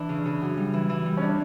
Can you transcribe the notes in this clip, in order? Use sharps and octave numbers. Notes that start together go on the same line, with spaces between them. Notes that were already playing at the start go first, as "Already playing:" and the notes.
Already playing: E3 D4
C#3
C#3
F#2
G3
E3
E3
G3
C#4
D4